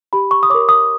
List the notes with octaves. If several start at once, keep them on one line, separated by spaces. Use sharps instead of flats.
G4 B5
C#6
D#6
A#4 C#5 D6
D#6